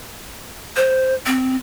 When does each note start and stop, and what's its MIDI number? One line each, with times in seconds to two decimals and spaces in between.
0.76 1.14 72
1.26 1.55 60